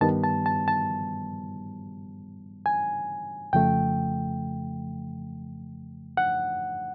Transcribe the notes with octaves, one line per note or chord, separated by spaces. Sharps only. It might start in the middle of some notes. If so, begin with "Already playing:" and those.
G2 D#3 G3 B3 A5
A5
A5
A5
G#5
F2 C#3 F3 A3 G5
F#5